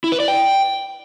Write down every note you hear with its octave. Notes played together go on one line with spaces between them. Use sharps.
E4
B4
D5
G5